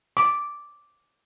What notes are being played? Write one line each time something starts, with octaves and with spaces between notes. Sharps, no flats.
D6